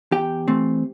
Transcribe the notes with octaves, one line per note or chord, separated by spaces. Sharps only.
E2 G4 G5
E3 A3 C4